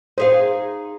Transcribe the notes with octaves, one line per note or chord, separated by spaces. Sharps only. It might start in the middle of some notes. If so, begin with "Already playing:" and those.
D#4 G#4 C5 F5